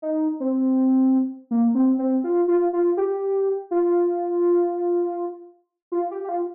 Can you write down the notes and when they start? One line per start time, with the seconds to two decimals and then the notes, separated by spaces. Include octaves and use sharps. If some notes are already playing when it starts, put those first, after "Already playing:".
0.02 D#4
0.40 C4
1.51 A#3
1.75 C4
1.99 C4
2.24 F4
2.48 F4
2.73 F4
2.97 G4
3.71 F4
5.92 F4
6.11 G4
6.24 G4
6.29 F4